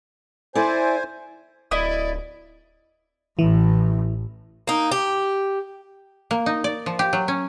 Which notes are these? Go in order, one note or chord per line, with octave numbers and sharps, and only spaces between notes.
E4 A4 C5 D5 G#5
D1 E4 D5 D#5
A1 A2 E3
A#3 D#4
G4
A#3
D#4
D5
F3
G4
F#3
C#4